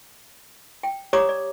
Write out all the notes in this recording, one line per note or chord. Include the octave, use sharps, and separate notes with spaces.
G5
G4 C#5 D5 A#5 D6 D#6
D5